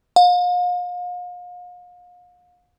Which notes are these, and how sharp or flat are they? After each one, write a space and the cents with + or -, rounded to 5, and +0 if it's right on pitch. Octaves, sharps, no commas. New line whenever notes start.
F5 +40